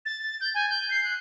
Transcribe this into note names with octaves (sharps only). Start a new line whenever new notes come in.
A6
G6
G#5
G6
C7
F#6